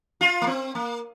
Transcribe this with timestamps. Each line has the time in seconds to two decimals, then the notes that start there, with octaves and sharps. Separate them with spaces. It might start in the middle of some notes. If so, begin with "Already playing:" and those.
0.21 F4
0.42 A#3
0.47 C4
0.75 A#3